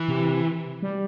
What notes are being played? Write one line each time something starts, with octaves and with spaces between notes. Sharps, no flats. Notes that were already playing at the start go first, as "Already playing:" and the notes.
Already playing: E3
C3
G3